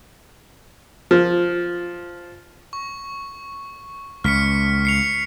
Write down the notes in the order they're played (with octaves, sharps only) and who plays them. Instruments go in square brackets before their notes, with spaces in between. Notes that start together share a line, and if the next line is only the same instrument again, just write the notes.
[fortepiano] F3
[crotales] C#6
[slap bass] C#2 [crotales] F6 B6 C#7
[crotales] C7 C#7 F7